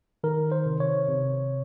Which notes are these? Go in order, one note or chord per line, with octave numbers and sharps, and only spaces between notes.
D#3 A#4
C5
C3
C#5
C3